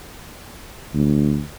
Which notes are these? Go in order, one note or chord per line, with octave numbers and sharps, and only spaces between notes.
D2